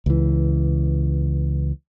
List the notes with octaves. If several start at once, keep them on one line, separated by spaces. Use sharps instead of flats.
C#2 E3